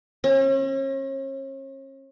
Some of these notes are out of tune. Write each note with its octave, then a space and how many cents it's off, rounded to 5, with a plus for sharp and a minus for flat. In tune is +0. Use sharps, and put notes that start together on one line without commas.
C#4 -40